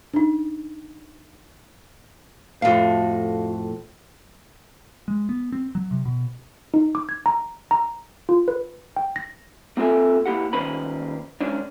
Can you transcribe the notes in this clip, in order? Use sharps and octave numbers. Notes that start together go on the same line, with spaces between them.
D4 D#4
F2 A2 F#4 F5
G#3
B3
C4
F#3
C3
B2
D#4
D6
G#6
A#5
A#5
F4
B4
G5
A#6
A#3 C4 F4 A4 E5 G#5
A#3 E4 G4 F#5
D#3 A#3 C#4 B4 C5 B5
G#2 C#4 D4